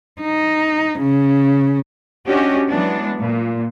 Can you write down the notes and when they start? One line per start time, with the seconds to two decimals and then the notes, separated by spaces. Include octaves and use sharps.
0.22 D#4
1.00 C#3
2.27 C#4 D4 F#4 G4 D#5
2.68 E3 F#3 G#3 B3 D4
3.19 A#2